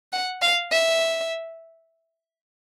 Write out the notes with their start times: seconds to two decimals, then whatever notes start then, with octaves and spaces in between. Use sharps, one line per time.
0.12 F#5
0.42 F5
0.71 E5